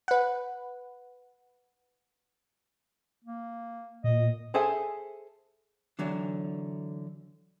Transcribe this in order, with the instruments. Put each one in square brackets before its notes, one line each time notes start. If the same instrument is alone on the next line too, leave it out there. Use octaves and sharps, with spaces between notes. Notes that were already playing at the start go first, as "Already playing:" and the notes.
[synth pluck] B4 F#5
[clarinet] A#3
[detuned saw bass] A#2 [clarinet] D#5
[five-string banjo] G#4 A4 C5 E5 G#5
[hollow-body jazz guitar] D3 E3 F#3 D4